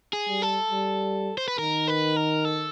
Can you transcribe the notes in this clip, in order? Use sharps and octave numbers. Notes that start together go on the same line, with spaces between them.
G#4
G3
A4
G3
C5
B4
D#3 A#4
B4
A#4
A4